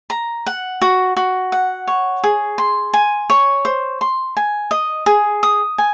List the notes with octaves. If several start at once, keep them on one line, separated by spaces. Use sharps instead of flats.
A#5
F#5
F#4
F#4
F#5
C#5
G#4
C6
G#5
C#5
C5
C6
G#5
D#5
G#4
D#6
G#5